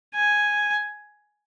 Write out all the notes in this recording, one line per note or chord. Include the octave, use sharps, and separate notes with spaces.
G#5